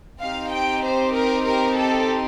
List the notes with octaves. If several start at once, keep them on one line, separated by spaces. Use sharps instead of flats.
C4 D#4 G4 F5
G5
C5
A#4
A#4
A4